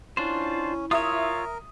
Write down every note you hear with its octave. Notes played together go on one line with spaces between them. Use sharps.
C#4 D4 E4 F4 C5
F4 A#4 C#5 E5 D#6